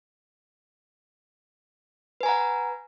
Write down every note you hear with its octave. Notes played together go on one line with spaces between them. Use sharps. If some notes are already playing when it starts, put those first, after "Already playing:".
B4 F#5 G#5 A#5